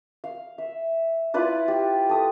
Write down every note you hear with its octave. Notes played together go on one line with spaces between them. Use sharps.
F5
E5
E4 F4 B4 D5
G4
A4 D#6